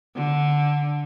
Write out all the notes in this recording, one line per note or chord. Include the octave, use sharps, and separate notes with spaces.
D3